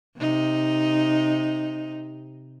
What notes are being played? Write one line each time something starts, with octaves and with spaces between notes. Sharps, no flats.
C3 D#4